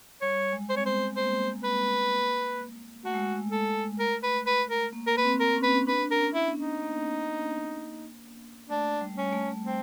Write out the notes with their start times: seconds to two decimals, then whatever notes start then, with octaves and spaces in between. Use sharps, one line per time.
0.21 G3 C#5
0.53 G#3
0.69 C5
0.75 C4 C#5
0.85 B3 C5
1.16 A#3 C5
1.64 B4
3.05 A3 F#4
3.14 G#3
3.23 A3
3.52 A4
3.99 A#4
4.23 B4
4.46 B4
4.70 A#4
4.93 A#3
5.07 A#4
5.17 B4
5.25 C4
5.40 A#4
5.56 C#4
5.63 C4 B4
5.71 C#4
5.87 D4 B4
6.11 A#4
6.19 C#4
6.34 E4
6.50 B3
6.58 D#4
6.81 A#3
8.70 A3 D4
9.01 G3
9.17 C#4
9.32 A3
9.64 C4